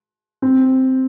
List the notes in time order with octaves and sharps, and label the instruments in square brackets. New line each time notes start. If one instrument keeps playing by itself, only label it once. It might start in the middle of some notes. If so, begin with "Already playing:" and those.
[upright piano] C4